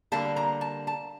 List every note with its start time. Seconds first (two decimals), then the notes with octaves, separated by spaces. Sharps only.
0.12 D3 G3 A#3 A5
0.36 A#5
0.61 A5
0.87 A5